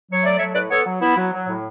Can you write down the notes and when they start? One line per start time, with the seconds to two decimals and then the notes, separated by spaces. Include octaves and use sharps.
0.09 F#3 C#5
0.24 A3 D5
0.38 F#3 C#5 E5
0.54 A2 B4 D5
0.70 B3 A4 C#5
0.86 F#3
1.01 B3 E4
1.17 F#3
1.32 F#3
1.48 A2